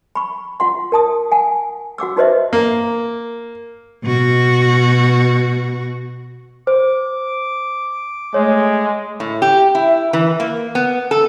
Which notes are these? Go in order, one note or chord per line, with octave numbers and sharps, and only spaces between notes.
B5 C#6
F4 F#5 C6
A#4 A5 D#6
F#5 G#5
F#4 F#5 D6 E6
D#4 F#4 B4 C5 D#5 E5
A#3
B2 F#4
C5 D6
G#3 A3 C#5
A2
G4
E4
E3
A#3
B3
A4